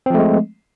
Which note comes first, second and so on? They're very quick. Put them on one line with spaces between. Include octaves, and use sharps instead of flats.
C4 F3 A3 G#3